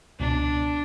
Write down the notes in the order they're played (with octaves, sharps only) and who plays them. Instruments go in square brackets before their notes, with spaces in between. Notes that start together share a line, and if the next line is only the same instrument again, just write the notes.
[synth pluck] C#2 B2 [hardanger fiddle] D4